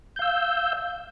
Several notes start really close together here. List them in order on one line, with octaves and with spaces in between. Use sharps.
G6 F5 E6